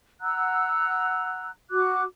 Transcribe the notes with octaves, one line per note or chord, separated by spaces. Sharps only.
F#5 A#5 E6 F#6
F#4 D6 F#6